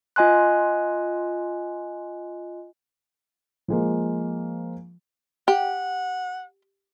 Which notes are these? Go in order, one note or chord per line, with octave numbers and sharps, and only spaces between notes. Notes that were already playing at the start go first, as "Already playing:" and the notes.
F4 D#5 G#5 C6 F#6
F3 G#3 A#3
G4 F#5